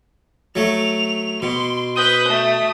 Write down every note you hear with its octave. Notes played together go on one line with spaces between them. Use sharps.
F#3 A3 F7
B2 C6
B4 D#6 G6
A3